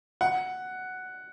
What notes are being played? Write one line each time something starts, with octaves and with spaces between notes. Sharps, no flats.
F#5